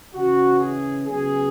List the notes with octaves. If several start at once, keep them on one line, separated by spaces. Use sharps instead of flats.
C#3 E3 C#4 F#4
G#4
C#3 F#3 B3 G#4